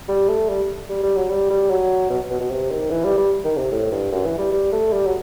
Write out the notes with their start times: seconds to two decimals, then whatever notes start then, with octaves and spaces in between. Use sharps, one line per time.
0.08 G3
0.29 A3
0.49 G3
0.89 G3
1.03 G3
1.16 F#3
1.30 G3
1.50 G3
1.69 F#3
2.10 B2
2.30 B2
2.40 B2
2.50 C3
2.71 D#3
2.90 E3
3.04 G3
3.17 G3
3.45 D#3
3.58 C3
3.72 A2
3.92 G2
4.12 F#2
4.25 E3
4.38 G3
4.52 G3
4.72 A3
4.92 G3
5.05 F#3